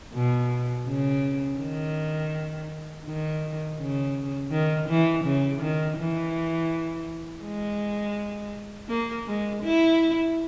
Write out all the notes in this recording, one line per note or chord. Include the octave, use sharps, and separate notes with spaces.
B2
C#3
D#3
D#3
C#3
D#3
E3
C#3
D#3
E3
G#3
A#3
G#3
E4